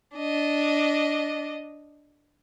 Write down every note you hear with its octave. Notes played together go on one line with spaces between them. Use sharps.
D4 D#5